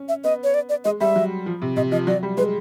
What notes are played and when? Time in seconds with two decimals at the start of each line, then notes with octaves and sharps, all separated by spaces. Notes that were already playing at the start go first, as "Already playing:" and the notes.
Already playing: C#4
0.09 E5
0.24 B3 D#5
0.44 C#5
0.54 D5
0.69 D5
0.85 G#3 D#5
1.00 G3 E5
1.16 F#3
1.46 F3
1.62 C3
1.76 C3 D#5
1.92 F3 D#5
2.07 F#3 D5
2.23 G3
2.37 G#3 B4